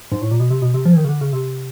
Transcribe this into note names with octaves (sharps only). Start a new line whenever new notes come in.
G#2
A2
A#2
B2
C3
B2
C3
F3
E3
D#3
C#3
D3
C#3
C3